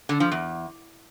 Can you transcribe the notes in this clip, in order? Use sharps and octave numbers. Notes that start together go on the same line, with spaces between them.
D3
F3
E2